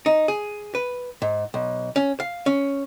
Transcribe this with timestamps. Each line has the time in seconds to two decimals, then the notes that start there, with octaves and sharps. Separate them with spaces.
0.06 D#4
0.28 G#4
0.75 B4
1.22 G#2
1.54 B1
1.96 C#4
2.20 F5
2.46 C#4